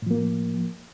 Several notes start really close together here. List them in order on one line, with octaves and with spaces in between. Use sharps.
A2 F3 A#3